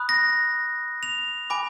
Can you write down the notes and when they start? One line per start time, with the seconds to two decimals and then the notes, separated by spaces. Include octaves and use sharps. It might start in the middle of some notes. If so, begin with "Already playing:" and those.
Already playing: B5 D#6 F#6
0.09 A#6
1.03 F7
1.50 G#5 B5 D6